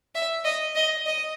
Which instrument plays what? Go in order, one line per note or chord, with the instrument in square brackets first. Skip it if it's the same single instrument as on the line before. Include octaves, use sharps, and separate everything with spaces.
[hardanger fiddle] E5
D#5
D#5
D#5